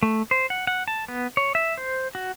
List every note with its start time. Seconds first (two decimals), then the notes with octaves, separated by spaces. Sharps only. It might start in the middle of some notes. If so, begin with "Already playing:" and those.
0.03 A3
0.31 C5
0.50 F#5
0.67 F#5
0.88 A5
1.08 B3
1.37 C#5
1.55 E5
1.77 C5
2.15 F#4